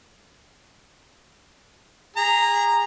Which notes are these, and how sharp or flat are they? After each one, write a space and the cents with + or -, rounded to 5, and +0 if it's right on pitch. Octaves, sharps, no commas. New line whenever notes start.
G#4 -30 A#5 +0